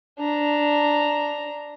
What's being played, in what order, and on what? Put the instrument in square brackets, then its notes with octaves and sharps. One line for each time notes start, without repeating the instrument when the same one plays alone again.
[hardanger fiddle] D4 A#5